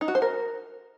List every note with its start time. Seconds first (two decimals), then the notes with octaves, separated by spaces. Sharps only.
0.01 D#4
0.08 F#4
0.15 C5
0.22 A#4